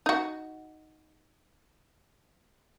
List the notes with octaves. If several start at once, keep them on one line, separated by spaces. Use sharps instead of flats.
D#4 F#4